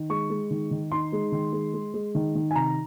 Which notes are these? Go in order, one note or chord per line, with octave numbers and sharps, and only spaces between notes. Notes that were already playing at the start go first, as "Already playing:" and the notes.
Already playing: D#3
G#3 C#6
G#3
D#3
D#3
D#4 C6
G#3
D#3
G#3
G#3
G#3
D#3
D#3
G#5
C3 A#5